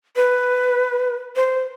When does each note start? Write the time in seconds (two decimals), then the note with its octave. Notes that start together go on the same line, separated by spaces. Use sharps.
0.16 B4
1.36 C5